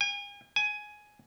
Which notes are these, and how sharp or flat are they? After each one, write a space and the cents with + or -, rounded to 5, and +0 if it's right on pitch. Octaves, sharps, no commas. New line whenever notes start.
G#5 -40
G#5 +10